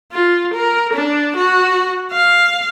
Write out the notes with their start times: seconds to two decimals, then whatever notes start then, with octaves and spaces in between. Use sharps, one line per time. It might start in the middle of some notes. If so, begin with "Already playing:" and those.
0.12 F4
0.54 A#4
0.93 D4
1.36 F#4
2.12 F5